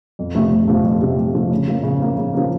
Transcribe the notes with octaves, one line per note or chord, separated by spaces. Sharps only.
F2
C3 F3 A3
F2
C3 F3 A3
F2
C3 F3 A3
F2
C3 F3 A3
C#3
F3 A#3
C#3
F3 A#3
C#3
F3 A#3